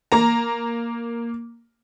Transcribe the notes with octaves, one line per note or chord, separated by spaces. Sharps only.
A#3 A#5